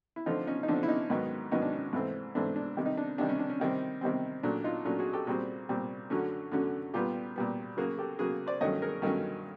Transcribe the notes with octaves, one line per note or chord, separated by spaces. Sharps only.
E4
D3 F3 A3 C4 D#4 F4
C#4 D#4
D#4
D3 F3 A3 C4 D4
E4
C#4 D#4
G#2 D#3 F#3 B3
G#2 D#3 F#3 B3 C#4 D#4
D4
C#4
G#2 E3 A3 C4
G#2 E3 A3 C4 D4
D4
C3 D#3 G3
D#4
D4
C3 D#3 G3 D4
C#4
D4
C#4
C3 D#3 G3 C4
C3 D#3 G3 C4
A#2 F#3 A3 C#4 D4
D#4 F4
A#2 F#3 A3 C#4 D4
F#4 G#4
G4 A4
A#2 G3 C4 F#4 G#4
A#2 G3 C4
F#2 D3 F#3 A3 C#4
F#2 D3 F#3 A3 C#4
A#2 G3 B3 F4 G4
A#2 G3 B3
C#3 F#3 A#3 F#4 G#4
G4 A4
C#3 F#3 A#3 F#4 G#4
C5 D5
G2 D#3 F#3 A3 C#4 C#5 D#5
G#4 A#4
G2 D#3 F#3 A3 C#4